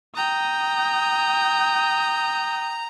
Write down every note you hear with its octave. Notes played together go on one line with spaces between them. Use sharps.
G5 A#5 D#6